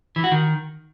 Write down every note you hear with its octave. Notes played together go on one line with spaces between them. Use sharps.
E3
F#4
D#3